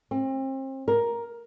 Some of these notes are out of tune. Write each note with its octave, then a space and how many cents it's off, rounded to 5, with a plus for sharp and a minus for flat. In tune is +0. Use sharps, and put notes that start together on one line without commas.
C4 +35
A#4 +10